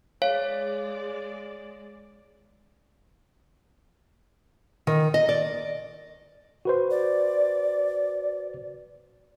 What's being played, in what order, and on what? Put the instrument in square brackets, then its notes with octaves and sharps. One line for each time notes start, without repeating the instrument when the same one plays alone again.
[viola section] G#3 D5 [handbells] C#5 [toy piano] F5
[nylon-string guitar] D#3
D#5
D5
[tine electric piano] F#4 B4 C5
[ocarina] D5